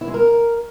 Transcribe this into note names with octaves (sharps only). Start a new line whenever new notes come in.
E4
G#3
A#4